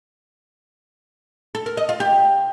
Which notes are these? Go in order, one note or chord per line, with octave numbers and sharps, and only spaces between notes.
A4
A#4
D#5
F4
G4